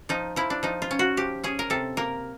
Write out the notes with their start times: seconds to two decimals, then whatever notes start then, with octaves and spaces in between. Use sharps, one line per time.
0.09 F3 D#4
0.36 F3 E4
0.50 D4
0.63 F3 D#4
0.82 F4
0.91 C#4
0.99 F#4
1.17 F3 G4
1.44 C#4 G#4
1.59 A#4
1.70 C3 A4
1.97 A#3 A#4